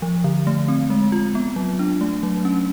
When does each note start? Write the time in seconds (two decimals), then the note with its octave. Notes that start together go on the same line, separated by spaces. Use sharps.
0.02 F3
0.24 D3
0.47 A3
0.68 C4
0.90 G#3
1.12 F4
1.35 B3
1.56 F#3
1.79 D4
2.01 A3
2.23 F#3
2.45 C#4